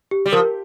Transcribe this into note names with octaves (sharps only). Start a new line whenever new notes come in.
G4
G3
F3 A#4